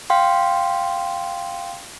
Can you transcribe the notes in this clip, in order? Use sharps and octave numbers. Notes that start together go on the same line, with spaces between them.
F5 G5 C6